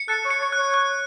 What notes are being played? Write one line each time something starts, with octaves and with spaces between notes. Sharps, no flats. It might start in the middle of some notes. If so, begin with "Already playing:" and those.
Already playing: C#7
A4 F#6
C#5
C#7
C#5
F#6
C#5
F#6